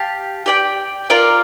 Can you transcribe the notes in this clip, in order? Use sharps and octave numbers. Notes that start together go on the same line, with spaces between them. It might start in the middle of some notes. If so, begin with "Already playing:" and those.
Already playing: G4 F5 A5
G4 D5 G5
F4 A#4 D5 F5